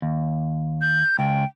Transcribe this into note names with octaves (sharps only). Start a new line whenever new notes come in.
D#2
G6
C#2 G5